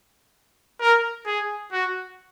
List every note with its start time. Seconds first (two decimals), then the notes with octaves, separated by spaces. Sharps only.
0.80 A#4
1.26 G#4
1.72 F#4